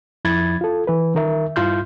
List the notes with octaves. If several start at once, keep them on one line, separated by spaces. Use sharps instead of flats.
F2 F3 E4 B5 G#6 A6
F4 A4
E3 B4
D#3 A#4 E5
G2 E4 F4 C6 F6 G6